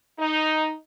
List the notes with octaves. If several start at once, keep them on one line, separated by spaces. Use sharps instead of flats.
D#4